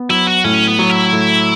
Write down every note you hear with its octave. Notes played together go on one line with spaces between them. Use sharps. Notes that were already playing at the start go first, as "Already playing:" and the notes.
Already playing: B3
F#3 E4
F#4
A2 C#4
B3
F#3
E4
A2